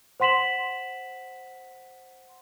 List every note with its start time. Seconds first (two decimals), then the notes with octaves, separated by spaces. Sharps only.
0.20 C5 F#5 C6 B6 E7 F#7